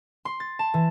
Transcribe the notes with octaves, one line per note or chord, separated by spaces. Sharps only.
C6
A6
A5
E3